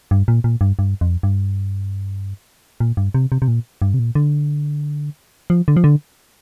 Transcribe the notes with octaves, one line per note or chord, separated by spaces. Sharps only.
G2
A#2
A#2
G2
G2
F2
G2
A#2
G2
C3
C3
C3
A#2
G2
C3
A#2
D3
F3
D3
F3
D3